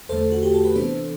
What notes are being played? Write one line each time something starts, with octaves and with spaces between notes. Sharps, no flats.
E2 D3 A3 A4 C5
F#4
G4
A4
B4
C3 E3 B3 D4 A4 C5